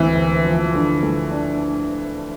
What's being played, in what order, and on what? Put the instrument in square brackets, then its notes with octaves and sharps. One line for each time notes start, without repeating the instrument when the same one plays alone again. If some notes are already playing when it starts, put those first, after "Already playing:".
Already playing: [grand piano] D2 C4 [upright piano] E3
[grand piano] D2
F3
D3
A3
D4